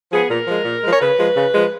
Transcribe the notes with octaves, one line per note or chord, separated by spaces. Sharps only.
F3 B3 G#4
A#2 A#4
F3 G#3
A#2
F3 G#3
C#5
C#3 B4
F3 G#3
C#3
F3 G#3